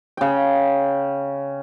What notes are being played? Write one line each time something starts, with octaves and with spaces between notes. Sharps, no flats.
C#3 G5